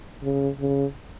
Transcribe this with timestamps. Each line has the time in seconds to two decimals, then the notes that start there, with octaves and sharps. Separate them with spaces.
0.23 C#3
0.59 C#3